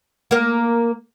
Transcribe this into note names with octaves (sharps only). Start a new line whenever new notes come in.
A#3 A#4